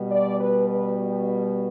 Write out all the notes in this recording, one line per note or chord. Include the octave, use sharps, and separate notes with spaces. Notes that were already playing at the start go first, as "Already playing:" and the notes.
Already playing: B2 G3
D5
B4
B4